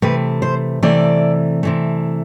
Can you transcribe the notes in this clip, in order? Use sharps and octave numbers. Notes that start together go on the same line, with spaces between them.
C3 E3 A3 B4
C5
C3 E3 A3 D5
C3 E3 A3